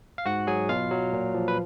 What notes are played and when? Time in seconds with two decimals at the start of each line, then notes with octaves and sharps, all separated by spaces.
0.18 F5
0.26 G#2 F#4 F#5
0.47 F#3 G#4 G#5
0.69 B2 F4 F5
0.91 F#3
1.13 A#2
1.34 F3
1.48 B4